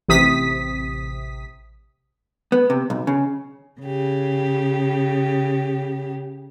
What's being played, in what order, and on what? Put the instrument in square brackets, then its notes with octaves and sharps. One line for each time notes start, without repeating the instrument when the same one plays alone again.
[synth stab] A1 C3 D#6 B6
[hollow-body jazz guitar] B3
C3
B1
C#3
[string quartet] C#3 G4